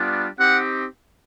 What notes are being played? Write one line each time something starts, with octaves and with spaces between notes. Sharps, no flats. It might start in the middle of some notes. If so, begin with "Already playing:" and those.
Already playing: G3 B3 D4 F4
C4 D#4 G4 F#5